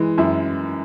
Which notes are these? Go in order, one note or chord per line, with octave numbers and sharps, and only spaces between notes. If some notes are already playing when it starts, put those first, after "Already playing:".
Already playing: E3 G#3
F#2 E4